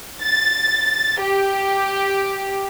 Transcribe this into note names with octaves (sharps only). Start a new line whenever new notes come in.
A6
G4